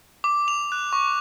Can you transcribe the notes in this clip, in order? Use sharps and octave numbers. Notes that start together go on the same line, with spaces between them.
D6
F7
F#6
C#6